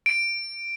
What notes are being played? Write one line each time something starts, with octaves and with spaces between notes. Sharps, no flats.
D7